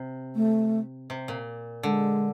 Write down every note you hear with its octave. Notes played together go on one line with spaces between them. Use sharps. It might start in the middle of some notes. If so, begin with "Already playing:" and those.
Already playing: C3
A3
C3
A#2
D3 G#3